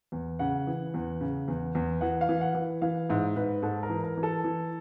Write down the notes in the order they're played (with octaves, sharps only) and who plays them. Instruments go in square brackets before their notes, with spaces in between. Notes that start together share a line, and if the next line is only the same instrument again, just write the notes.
[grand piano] E2
C#3 F#5
E3
E2
C#3
E2
E2
E3 F#5
F5
E3
F#5
E3
E3 F5
G#2 E5
G#2 B4
G#2 A4
A#4
E3
A#4
E3
A4
E3